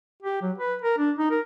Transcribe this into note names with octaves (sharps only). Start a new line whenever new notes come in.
G4
F#3
B4
A#4
D4
D#4
A#4